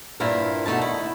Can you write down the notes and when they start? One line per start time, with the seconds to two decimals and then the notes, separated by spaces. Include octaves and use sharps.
0.20 G2 A#2 C4 E4 A#4
0.66 B2 D3 A3 D#4 A5
0.81 D#3 E4